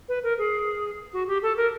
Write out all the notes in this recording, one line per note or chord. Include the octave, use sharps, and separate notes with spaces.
B4
A#4
G#4
F#4
G4
A4
A#4